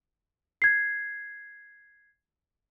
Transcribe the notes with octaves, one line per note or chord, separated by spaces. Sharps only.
G#6 C7